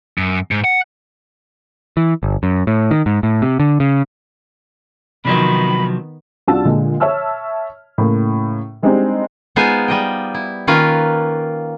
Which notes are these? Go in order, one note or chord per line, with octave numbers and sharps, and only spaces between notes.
F#2
G#2
F#5
E3
G1
F#2
A2
D#3
G#2
A2
C3
D3
C#3
C3 D#3 F3 F#3 B3 B5
C2 D4 F4 F#4 A5 E6
A#2 D3 G#3
C#5 E5 A5 E6 F6
A2 C#3 A#3
G3 G#3 C4 D4 D#4
G#3 B3 D#4 F4 C5 G#5
G3 D#5 G5
E4
D#3 A#3 C#4 F4 A#4 B4